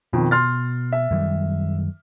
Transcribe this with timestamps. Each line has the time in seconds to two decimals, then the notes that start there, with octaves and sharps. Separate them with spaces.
0.13 F2 B2 D#3
0.31 C6 F6 A6
0.93 E5
1.11 F#2 D#3 G3